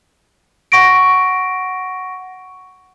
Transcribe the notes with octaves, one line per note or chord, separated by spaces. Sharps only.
F#5 C#6 A#6 D7